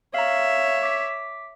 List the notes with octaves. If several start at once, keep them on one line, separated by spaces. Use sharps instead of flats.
C#5 E5 F5 A#5
D6 B6